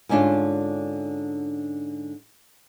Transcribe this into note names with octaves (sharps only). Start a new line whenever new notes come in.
G#2 D3 C#4 D4 F4